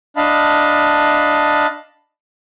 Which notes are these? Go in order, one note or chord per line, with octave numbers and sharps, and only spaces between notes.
D4 D#5 F5 A5 B5